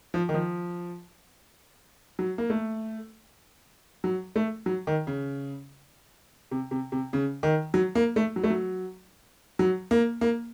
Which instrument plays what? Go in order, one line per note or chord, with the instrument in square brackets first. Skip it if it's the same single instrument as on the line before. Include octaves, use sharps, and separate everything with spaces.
[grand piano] F3
D#3
F3
F#3
A#3
A3
F#3
A3
F#3
D#3
C#3
C3
C3
C3
C#3
D#3
F#3
A#3
A3
F#3
A3
F#3
F#3
A#3
A#3